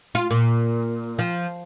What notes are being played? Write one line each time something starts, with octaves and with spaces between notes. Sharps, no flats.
F4
A#2
F3